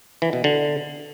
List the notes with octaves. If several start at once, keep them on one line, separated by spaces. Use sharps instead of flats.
E3
B2
D3